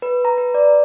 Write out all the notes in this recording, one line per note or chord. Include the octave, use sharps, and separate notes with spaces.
B4
A#5
B4
D5